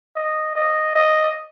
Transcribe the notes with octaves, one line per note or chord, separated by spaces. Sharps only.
D#5
D#5
D#5